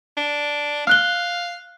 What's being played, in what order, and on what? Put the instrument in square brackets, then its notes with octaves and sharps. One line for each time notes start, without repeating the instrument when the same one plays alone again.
[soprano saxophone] D4
[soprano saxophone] F5 [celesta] F6 F#6 G7